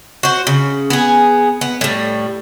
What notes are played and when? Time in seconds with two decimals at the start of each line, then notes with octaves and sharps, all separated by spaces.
0.23 F#4 C5
0.47 C#3
0.90 B3 G#4
1.61 B3
1.81 A2 G3